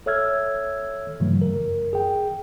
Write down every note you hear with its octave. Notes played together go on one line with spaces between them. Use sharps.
A4 C#5 E5 E6 F6 G#6
G2 C#3 E3 F#3 A3
F#2 A#4
G#4 G5